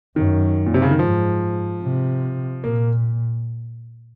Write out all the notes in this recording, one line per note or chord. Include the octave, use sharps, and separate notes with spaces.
F#2 D#3
A#2
C3
C#3
D#3
G#2 F3
C3
A#2 A#3